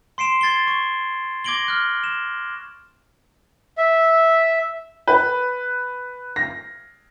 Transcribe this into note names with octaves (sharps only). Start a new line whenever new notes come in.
C6 C7 D7 E7
G#6 A6 C7 G7
C#6
D6 G#6 A#6 D7 F#7 G7
F6 F#6
E7
E5
B4
A#6